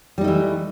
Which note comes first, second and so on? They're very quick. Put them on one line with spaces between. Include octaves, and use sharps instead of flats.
G3 D#4 A3 E3